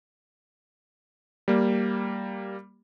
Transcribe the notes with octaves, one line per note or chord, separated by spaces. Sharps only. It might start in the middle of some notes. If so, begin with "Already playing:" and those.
G3 A#3